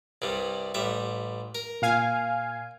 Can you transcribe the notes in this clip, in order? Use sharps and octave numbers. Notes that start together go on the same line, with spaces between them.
C2 G2 G3
A1 G3 E5
A#4
A#2 F5 G#5